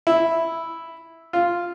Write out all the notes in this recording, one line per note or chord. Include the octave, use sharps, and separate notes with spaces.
E4
F4